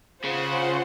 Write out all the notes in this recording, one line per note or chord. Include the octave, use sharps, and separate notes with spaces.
C#3 F4 C5 F#5